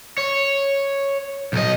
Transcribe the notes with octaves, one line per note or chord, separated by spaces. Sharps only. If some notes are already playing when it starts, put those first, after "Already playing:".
C#5
B1 D#5